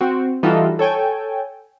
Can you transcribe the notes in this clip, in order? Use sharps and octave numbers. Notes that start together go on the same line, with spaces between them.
C4 F#4
E3 G3 D#4 F4 F#4 A4
A4 C#5 G5 G#5